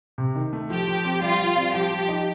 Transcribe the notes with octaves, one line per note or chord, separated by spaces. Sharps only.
C3
D#3
A3
F3 G4
F3
C4
G3 F4
G3
C4
F3 G4
F3
D#4